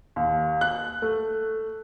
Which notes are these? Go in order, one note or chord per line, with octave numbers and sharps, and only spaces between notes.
D#2
F#6
A3